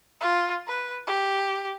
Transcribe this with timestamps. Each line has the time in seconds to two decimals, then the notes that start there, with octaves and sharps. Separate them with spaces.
0.21 F4
0.68 B4
1.07 G4